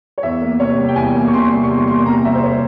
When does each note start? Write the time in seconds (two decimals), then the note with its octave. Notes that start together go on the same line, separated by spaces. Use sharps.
0.18 C#5
0.23 E2 E5
0.42 A#3
0.60 C3 C#5
0.78 G3
0.88 G5
0.96 E2 G#5
1.15 A#3
1.28 C#6
1.32 C3 C6
1.52 G3
1.63 C#6
1.69 E2 C6
1.87 A#3 C6
2.06 C3 A#5
2.25 G3 E5
2.34 C5
2.43 C#5